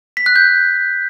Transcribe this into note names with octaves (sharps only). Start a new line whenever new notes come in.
B6
F#6
G6